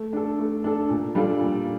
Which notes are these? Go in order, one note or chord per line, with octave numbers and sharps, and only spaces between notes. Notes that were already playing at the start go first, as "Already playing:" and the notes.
Already playing: A3
D4 A4
A3
D4 A4
A#2
G3 D4 F4 A4
A#2